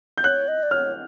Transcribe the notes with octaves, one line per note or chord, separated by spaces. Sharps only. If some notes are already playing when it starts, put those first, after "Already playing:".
G6
C#5 F#6
D#5
D5
C#5 F6